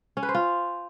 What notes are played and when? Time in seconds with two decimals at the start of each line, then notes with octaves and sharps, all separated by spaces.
0.17 C#4
0.23 B4
0.29 C5
0.34 F4